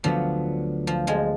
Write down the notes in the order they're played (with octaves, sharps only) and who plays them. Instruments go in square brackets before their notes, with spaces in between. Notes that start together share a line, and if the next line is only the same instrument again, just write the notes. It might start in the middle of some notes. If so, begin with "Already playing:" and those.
[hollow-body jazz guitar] D2 D3 F#3 B3 [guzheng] F3
[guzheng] F3
F3 G#3